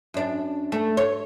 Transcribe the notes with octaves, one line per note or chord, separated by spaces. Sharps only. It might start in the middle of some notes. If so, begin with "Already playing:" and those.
F#2 D4
A3
C#5